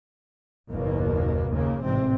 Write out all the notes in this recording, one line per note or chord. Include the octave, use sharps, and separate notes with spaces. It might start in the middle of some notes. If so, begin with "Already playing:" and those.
F#1 D#2 B2 A#3
D#2 C#3 A#3
A1 G#2 C3 C4